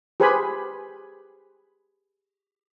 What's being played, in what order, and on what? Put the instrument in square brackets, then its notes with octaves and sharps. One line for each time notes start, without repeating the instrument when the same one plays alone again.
[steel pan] G4 G#4 B4 C5 G#5 B5